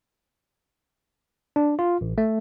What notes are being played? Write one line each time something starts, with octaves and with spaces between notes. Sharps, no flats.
D4
F4
A1
A3